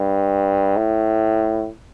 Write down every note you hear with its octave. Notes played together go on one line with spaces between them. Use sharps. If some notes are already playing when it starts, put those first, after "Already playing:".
Already playing: G2
A2